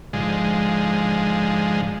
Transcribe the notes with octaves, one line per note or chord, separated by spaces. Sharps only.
G#2 D3 F3 G#3